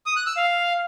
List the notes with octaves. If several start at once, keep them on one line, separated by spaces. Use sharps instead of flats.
D#6
F#6
E6
F5